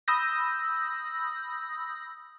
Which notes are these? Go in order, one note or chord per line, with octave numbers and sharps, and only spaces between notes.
B5 D#6 E6 G6 A#6